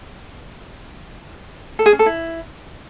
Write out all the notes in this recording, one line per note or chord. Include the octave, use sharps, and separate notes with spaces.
A4
G#4
C#4
A4
E4